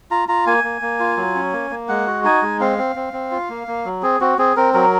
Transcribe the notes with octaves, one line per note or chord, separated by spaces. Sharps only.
F4 A#5
F4 A#5
A#3 G#5
A#3
A#3
F4
F#3
C#4
A#3
A#3
G#3 F#5
F#4
D#4 G#5
G#3
C4 F5
C4
C4
C4
F4
A#3
A#3
F#3
C4 G#4
C4 F#4
C4 G#4
C4 A#4
F#3 A#4